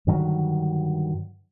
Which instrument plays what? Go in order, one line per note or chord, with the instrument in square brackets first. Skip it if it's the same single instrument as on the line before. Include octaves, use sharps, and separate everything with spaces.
[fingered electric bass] G2 D3 D#3 F#3